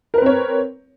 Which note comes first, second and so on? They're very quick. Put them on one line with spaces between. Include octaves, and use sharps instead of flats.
A#4 B4 C4 C#5